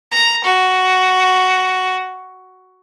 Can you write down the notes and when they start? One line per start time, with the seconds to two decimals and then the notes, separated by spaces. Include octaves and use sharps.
0.11 A#5
0.44 F#4